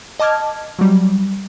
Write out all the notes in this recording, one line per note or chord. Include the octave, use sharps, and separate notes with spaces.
D#5 A5 D6 F6 G#6
F#3 G3